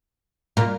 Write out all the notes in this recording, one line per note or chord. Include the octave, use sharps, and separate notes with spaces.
A#2